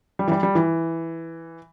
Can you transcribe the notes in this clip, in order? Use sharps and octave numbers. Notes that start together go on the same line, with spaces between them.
G3
E3
G3
G3
E3